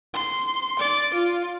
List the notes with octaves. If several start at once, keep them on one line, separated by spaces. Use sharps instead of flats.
C6
D5
F4